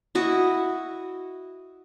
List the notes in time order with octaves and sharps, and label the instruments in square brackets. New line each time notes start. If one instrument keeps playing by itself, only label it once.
[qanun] E4 F#4 D#5